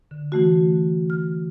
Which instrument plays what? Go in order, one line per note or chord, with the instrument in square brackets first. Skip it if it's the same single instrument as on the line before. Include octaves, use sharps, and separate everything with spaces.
[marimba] D3
E3 A3 F#4
F6